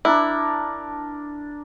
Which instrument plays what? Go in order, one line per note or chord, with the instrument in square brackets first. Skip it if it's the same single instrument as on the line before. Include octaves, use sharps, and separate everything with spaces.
[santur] D4 A#4 [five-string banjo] E4